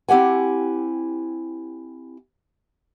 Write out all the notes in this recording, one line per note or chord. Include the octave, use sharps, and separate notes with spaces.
C4 E4 G4 F#5 G#5